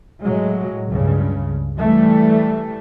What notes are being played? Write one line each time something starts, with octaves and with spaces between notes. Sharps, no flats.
A2 F#3 G#3
C#2 G2 C#3
E3 G3 A3